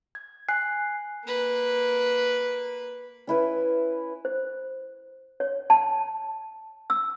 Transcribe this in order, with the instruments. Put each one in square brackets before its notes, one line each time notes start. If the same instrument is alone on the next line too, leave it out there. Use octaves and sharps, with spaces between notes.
[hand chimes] G#6
G#5 F#6 C7
[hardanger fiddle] A#3 B4
[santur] C#4 E4 B4
[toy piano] C5
C#5
A5
E6